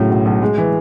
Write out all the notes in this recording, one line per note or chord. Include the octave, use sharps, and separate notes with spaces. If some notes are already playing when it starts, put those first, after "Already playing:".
Already playing: A2 C#3 F#3
B1
B1
G#3
E3